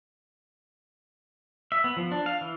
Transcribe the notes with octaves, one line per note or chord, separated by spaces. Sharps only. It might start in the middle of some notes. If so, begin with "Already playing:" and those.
E5
B3
F3
D4
F5
E3